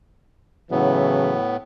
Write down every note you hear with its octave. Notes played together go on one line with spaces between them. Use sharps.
A2 C#3 E3 F#3 B3